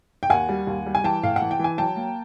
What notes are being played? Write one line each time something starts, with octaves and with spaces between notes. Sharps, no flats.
G5
D#2 F#5 G#5
G3
D#2
G3
G#5
E3 G5 A5
A2 F5
F#5
E3
G5
E3 G#5
F#3 G5 A5
A#3